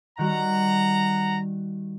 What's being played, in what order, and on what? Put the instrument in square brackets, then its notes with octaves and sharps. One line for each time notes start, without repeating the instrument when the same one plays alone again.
[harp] D#3 G3 F#4 [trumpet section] F#5 A#5